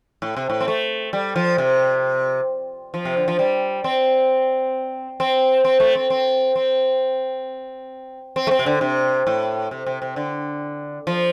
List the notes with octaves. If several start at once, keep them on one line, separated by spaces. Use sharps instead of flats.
A2
C3
A2
C4
A3
G3
F3
C3
F3
C3
D3
F3
G3
C4
C4
C4
A3
C4
C4
C4
C4
A3
C4
C3
D3
C3
A2
C3
C3
C3
D3
F3